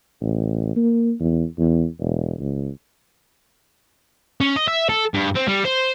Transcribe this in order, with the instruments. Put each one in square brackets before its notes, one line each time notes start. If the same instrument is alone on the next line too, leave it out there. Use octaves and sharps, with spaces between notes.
[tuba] A1
A#3
E2
E2
E1
C#2
[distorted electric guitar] C#4
D#5
E5
A4
G2
C4
G3
C5